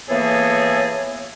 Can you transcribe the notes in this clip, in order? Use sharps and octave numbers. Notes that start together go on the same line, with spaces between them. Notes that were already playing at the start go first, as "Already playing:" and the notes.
E3 A#3 B3 G#4 A4 C#5